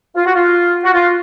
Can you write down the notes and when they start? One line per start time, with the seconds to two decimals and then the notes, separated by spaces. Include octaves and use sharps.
0.15 F4
0.25 F#4
0.34 F4
0.83 F#4
0.93 F4